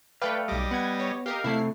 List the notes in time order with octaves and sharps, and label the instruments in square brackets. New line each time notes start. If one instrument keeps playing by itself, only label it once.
[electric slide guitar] A3 F5 [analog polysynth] B4 D5 G5
[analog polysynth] B1 D6 [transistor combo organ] G3 D#5
[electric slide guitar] B3 [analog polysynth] F#5 G#6
[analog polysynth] C#5
[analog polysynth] G4 A#4 D#5 [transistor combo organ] F5
[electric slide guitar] C3 A3 [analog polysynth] E4 C7